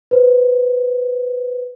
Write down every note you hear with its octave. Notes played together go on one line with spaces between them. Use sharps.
B4 C5